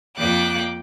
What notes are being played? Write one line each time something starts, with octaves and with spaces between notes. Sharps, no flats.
F2 A#3 G5 D6 F#6